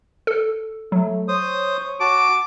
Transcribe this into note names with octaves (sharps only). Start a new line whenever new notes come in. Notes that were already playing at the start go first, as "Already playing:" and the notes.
A4
F#3 A3
C5 C#5 D#6
F#4 A5 D6